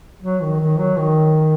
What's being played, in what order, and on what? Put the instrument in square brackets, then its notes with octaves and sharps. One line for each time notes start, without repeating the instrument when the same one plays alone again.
[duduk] F#3
D#3
D#3
F#3
D#3